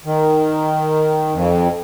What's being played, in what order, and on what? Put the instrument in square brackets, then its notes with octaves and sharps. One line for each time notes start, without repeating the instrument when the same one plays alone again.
[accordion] D#3
F2